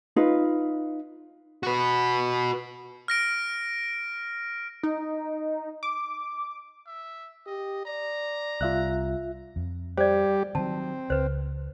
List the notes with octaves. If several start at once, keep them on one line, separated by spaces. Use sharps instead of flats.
D#4 F4 B4
F#4 B4
F6 A#6 D7
D#4
D6
E5
G4 D#5
D5 A#5
C2 F4 E5 F#6
F2
G3 G4 C5 D5
D#3 F#3 C4 A5
C#2 B4 C5